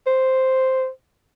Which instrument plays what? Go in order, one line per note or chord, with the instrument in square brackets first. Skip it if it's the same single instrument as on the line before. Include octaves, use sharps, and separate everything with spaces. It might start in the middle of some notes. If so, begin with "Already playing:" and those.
[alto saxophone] C5